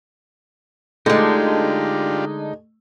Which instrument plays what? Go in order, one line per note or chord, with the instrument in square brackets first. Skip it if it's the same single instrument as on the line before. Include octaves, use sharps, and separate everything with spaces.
[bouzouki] D3 G#3 [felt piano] A3 [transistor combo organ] D4 F4 G4 [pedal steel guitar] D#4